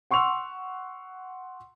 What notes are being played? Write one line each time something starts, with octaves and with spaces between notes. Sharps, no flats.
F#5 C6 C#6 E6 F7